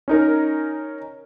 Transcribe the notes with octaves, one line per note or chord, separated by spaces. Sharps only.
C#4 D#4 A#4